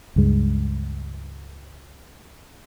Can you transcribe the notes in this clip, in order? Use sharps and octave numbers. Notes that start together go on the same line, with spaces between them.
C#2 G2 G#3